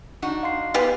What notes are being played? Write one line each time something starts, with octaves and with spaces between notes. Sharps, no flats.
D4 D#4 F#4
F5 C6 C7
B3 G4 G#4